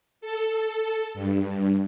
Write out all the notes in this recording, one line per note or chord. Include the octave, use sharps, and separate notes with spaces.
A4
G2